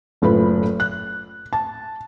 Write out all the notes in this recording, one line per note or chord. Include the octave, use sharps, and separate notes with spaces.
F#1 A2 F4 B4 B5
F#6
A5